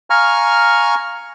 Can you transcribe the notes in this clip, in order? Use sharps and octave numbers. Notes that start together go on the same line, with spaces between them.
F5 G#5 A#5 C#6 F6